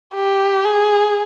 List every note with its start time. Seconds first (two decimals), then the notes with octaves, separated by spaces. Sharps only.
0.14 G4
0.65 G#4